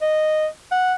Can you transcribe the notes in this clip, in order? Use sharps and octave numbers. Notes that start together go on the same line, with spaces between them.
D#5
F#5